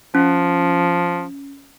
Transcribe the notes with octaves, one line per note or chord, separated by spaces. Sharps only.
F3 C#4